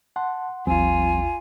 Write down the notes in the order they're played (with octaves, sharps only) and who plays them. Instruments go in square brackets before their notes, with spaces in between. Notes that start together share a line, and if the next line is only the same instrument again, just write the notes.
[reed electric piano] F#5 C6 [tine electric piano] A5
[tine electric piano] G#1 D#2 [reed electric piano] F3 G3 C4 [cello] F4 [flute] G#5